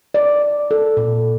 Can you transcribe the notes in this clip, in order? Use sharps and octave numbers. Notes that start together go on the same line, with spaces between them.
D5
A4
A#2